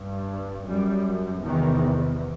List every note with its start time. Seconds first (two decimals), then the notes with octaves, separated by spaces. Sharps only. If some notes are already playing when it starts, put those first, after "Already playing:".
Already playing: G2
0.69 F#2 G3
1.45 E2 C3 D#3